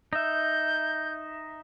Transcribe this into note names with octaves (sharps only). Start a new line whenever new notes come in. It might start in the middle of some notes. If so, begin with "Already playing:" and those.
D#4 E5 G6